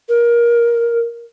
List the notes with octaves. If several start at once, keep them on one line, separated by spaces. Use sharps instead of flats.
A#4